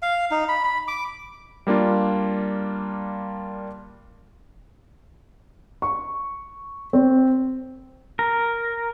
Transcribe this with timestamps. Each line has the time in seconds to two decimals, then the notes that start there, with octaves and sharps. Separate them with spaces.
0.02 F5
0.31 D#4
0.49 B5
0.64 B5
0.88 D6
1.67 G3 A#3 D4 F4
5.82 C#6
6.93 C4
8.19 A#4